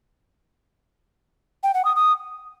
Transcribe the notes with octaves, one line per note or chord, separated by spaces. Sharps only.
G5
F#5
D#6
D#6